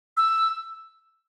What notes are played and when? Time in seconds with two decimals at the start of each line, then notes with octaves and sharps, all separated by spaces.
0.17 E6